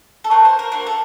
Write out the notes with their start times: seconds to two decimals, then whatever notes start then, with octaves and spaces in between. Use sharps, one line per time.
0.24 A4
0.30 A3 C4 F#4 A#4
0.45 C5
0.59 A#4
0.72 A#3 D4 F#4 A#4
0.87 A4